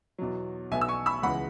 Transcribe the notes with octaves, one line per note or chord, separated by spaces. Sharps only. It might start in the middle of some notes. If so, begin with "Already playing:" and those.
E2 B2 F#3
B1 B2 B3 E5 G#5
E6
G#5 C#6
B5 E6
C#2 C#3 E3 G#3 F#5 B5